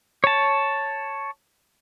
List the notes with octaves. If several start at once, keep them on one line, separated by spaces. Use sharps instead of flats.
C#5 A5